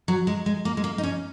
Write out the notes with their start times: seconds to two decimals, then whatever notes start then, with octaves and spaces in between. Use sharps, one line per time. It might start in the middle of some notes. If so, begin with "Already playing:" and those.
0.08 F#3
0.27 G#3
0.46 G#3
0.65 A#3
0.77 G#3
0.84 A#3
0.98 D#4
1.03 C#4